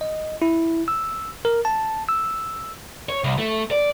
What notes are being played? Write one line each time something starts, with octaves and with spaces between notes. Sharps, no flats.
D#5
E4
E6
A#4
A5
E6
C#5
C2
A3
D5